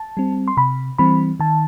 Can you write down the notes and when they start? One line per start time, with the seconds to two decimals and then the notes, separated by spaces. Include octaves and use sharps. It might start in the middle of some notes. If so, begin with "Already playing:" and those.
Already playing: A5
0.17 G3 C4
0.48 C6
0.57 C3 B5
0.98 E3 G3 C4 B5
1.40 D#3 A5